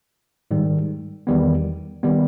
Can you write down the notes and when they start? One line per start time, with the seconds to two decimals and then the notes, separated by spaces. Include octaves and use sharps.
0.51 G#2 D#3 G3
1.27 E2 D#3 G3 B3
2.03 D#3 G3 B3